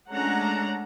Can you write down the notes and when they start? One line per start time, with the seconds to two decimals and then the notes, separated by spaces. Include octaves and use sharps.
0.10 G#3 A3 C#4 D4 F#5 A#5